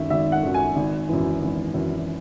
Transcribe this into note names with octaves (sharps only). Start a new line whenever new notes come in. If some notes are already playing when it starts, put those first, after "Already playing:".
Already playing: G#1 F#2 D#3 E5
G#1 E5
F#5
F#2 D#3
G#5
G#1
F#2 E3
G#1
F#2 E3